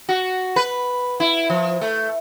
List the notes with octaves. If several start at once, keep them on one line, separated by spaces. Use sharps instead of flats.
F#4
B4
E4
F3
A3